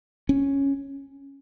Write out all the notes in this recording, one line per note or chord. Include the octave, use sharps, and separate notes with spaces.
C#4